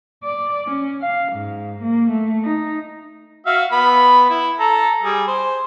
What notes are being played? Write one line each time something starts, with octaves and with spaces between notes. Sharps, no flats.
D5
C#4
F5
G#2
A#3
A3
D#4
F#4 E5 F5
B3 B5
E4
A4 A#5
G3 G#4
C5